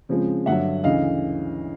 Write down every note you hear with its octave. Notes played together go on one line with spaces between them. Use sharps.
C#3 F3 G#3 C4
G2 D3 F#3 E5 F#5
D2 C#3 E3 D#5 F5